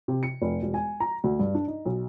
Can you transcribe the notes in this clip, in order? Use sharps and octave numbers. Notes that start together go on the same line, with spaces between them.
C3
C#7
F1
E1
G#5
A#5
D2
G2
D4
D#4
B1